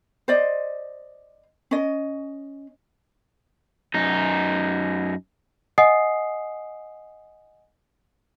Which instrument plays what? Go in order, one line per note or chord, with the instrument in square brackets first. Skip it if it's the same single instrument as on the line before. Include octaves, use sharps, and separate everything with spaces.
[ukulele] C5 D5 D#5
C#4 D#5
[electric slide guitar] F#2 D#4
[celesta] D#5 F#5 G#5 D#6 C7